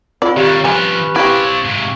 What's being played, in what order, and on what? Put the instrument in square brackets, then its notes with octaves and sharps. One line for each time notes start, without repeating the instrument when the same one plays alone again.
[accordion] A2 [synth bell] C4 F4 [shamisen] D5
[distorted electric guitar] D#3 G3 [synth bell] G4 [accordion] C#5 F5
[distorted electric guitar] F3 B3 [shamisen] G3 G#5 [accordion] C#4 B4
[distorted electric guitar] C4 D5 [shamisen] E4 G4 [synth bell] F5 C#6 G#6
[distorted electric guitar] G#2 C3